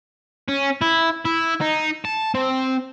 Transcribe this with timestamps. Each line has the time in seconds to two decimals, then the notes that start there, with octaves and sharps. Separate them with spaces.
0.49 C#4
0.82 E4
1.25 E4
1.61 D#4
2.05 A5
2.35 C4